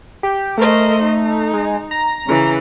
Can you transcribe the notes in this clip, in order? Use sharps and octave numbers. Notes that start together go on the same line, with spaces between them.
G4
A3 A#4 C5 D#5
D#4
G#3
A#5
C#3 E3